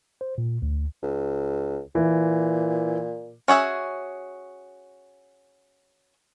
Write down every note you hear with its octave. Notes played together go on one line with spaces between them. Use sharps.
C5
A#2
D2
C#2
A#2 E3
C#4 F#4 G#4 E5